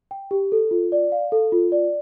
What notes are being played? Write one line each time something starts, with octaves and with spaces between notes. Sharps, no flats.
G5
G4
A4
F4
D5
F5
A4
F4
D5